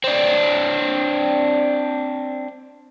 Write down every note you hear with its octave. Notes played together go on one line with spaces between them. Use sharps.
C4 D4